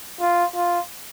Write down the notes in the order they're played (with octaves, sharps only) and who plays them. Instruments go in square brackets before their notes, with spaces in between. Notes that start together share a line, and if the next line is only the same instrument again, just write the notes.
[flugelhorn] F4
F4